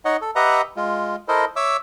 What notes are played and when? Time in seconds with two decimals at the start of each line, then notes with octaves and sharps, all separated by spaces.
0.05 D#4 C#5 D#5 F#5
0.22 A4
0.36 G4 B4 D#5 E5 F#5 A#5
0.76 G#3 F4
1.28 E4 A4 A#4 C5 D#5
1.56 C#5 E5 D6 E6